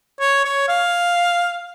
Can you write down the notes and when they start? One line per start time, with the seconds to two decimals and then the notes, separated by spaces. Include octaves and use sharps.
0.20 C#5
0.45 C#5
0.69 F5